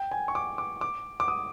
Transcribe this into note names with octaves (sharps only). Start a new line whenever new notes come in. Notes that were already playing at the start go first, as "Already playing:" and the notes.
Already playing: G5
G#5
C#6
D6
D6
D6
D6
D#6